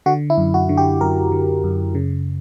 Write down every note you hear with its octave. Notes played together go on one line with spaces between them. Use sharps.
D3 F#4
E4
F#2
F#4
D3
G4
F#2 A#4
D3
F#2
C#3